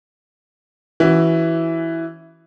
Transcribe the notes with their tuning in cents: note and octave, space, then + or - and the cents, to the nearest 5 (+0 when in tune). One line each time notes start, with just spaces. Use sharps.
E3 +0 C#4 +0 F#4 +20